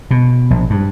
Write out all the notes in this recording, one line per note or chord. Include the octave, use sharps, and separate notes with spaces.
B2
A#1
G2